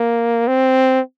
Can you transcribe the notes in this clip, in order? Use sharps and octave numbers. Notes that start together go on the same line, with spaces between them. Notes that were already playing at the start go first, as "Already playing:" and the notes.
Already playing: A#3
C4